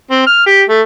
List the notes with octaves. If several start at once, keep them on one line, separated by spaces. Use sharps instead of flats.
C4
F6
G4
A3